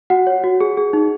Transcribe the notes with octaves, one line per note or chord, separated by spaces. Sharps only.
F#4 F#5
C#5
F#4
G#4
G#4
D#4